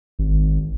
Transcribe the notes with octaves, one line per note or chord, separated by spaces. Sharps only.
G#1